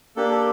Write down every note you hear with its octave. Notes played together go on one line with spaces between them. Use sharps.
A#3 D4 G4 A4
A4